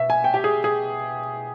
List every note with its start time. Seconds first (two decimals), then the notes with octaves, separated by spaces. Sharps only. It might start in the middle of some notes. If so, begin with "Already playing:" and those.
Already playing: B2 E5
0.10 G#5
0.24 G5
0.34 G4
0.44 G#4
0.64 G#4